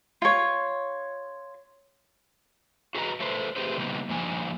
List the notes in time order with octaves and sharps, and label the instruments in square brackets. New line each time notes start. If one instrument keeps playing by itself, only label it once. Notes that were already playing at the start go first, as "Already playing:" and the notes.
[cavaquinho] F4 C#5
[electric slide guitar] F#4 G#4 B4 D#5 G#5 A#5
A3 A4 B4 C5
A3 C4 G4 G#4 B4 C5
C#3 G3 A#3 B3 D#4
G2 D3 F3 A#3 D#4 G#5